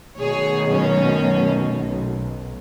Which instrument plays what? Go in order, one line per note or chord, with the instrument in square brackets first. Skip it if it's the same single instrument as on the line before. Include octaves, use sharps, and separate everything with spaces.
[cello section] B2 D#3 A3 [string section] G#4 C#5
[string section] F#2 C#4
B1